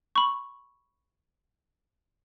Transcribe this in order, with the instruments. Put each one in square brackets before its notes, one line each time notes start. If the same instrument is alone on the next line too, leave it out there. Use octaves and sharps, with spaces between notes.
[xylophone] B5 C#6